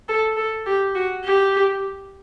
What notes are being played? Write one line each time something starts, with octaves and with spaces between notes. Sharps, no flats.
A4
A4
G4
F#4
G4